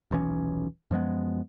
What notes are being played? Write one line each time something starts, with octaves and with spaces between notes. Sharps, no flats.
D#1 B1 E3 C#4
F#2 F3 G#3 B3